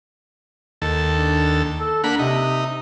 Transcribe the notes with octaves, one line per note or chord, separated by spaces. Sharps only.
D#2 A4
D4
A4
A#3 D4 F#5 B5
C3 D#4